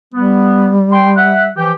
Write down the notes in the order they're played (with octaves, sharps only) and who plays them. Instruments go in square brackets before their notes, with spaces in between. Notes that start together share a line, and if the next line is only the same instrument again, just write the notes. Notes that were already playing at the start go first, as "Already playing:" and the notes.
[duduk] G3 [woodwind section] B3
[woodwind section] G5 C6
E5 F#5
E3 F3 G4